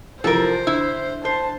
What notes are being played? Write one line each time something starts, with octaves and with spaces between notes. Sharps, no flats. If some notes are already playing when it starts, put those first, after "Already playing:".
C3 E3 F3 A4 A#4 C5
D3 E4
C5 A5